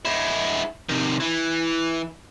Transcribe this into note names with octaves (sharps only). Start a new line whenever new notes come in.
G#3 E4
C3 D#3
E3